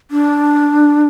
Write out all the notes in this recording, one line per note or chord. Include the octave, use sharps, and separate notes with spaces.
D4